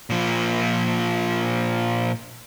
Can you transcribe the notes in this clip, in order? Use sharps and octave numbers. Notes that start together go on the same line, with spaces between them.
A#2 F3